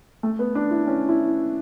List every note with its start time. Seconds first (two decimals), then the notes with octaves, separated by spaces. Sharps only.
0.23 A3
0.39 B3
0.55 D4
0.71 E4
0.87 C#4
1.09 E4